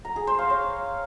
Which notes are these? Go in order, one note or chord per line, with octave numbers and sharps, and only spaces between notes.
A#5
G#4
C5
F5
C#5